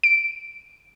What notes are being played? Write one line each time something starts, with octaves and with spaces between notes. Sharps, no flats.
D7